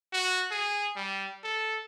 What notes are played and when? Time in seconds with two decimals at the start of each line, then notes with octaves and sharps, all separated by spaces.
0.13 F#4
0.51 G#4
0.96 G3
1.44 A4